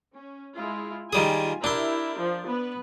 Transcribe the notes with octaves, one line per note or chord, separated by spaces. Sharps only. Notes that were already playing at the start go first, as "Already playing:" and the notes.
C#4
G#3 E4 F4
D#3 G3 F4 G#4 G#5
D4 E4 G4 A#4 C6
F3
B3 B4